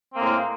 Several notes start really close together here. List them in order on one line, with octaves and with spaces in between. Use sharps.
C4 A#3 G#3 A2